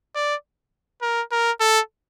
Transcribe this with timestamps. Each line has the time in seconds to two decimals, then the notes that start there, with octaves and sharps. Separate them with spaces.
0.15 D5
1.02 A#4
1.32 A#4
1.60 A4